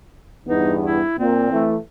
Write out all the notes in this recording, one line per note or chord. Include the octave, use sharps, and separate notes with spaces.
E2 G2 B3 D#4
E4
A#2 C4
E3 A3